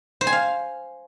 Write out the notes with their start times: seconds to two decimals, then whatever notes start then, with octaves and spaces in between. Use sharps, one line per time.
0.21 C5
0.27 G#5
0.33 F5